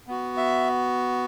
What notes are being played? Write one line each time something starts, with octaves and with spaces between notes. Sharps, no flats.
B3 F#4
E5